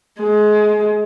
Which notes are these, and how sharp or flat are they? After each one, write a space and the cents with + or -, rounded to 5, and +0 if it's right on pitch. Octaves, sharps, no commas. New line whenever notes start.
G#3 +25